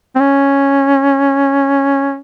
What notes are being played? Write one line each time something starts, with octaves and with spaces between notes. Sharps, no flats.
C4
C#4